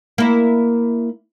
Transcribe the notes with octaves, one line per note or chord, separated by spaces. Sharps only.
A#3 E4